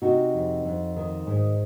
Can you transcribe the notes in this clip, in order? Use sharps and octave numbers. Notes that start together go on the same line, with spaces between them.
C3 D#4 F#4
F2
F2
D#3
G#2